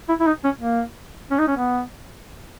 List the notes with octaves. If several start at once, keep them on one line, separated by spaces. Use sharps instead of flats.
E4
E4
D#4
C#4
A#3
C#4
D#4
C#4
B3